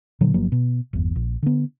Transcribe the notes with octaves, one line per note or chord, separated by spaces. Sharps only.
A#2 D3 F3 F#3
G1 F3 F#3 A#3
B2
G1 E2
A#1
D3 B3